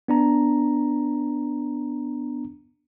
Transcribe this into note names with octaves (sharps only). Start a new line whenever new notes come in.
B3 D4 A#5